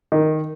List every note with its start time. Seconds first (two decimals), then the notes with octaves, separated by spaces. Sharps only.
0.12 D#3